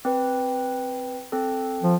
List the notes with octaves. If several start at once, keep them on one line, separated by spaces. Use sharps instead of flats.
C4 B4
C4 A4
F3